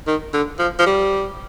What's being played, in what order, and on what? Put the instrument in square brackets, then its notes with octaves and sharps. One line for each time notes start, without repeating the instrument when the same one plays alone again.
[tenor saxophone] D#3
D3
F3
F3
G3